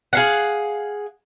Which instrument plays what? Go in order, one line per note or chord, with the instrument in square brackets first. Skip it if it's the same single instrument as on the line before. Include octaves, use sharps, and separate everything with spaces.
[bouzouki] G#4 F5 F#5